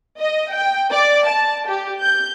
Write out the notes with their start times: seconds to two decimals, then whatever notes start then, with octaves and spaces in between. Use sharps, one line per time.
0.19 D#5
0.53 G5
0.92 D5
1.26 A5
1.67 G4
2.01 G6